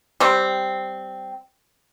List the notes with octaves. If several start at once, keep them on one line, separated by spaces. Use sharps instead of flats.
G3 C4